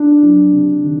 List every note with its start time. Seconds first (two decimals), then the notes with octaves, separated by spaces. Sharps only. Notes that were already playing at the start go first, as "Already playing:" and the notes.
Already playing: D4
0.23 F#3
0.53 C3
0.84 D#3